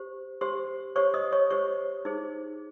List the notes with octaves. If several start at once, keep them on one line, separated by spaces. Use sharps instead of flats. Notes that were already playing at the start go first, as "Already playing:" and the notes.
Already playing: G4 C5
G4 C5 C6
G4 C5 C#5 C#6
D#5 D#6
C#5 C#6
G4 C5 C#5 C#6
D#4 G#4 C5